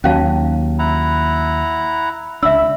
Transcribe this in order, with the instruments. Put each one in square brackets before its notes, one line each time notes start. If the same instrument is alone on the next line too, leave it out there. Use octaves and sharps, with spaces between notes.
[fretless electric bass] D#2 F#3 [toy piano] C#4 F5 A5
[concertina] E4 F#5 A#5
[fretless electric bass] C#2 D4 [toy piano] E5 E6 [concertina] B5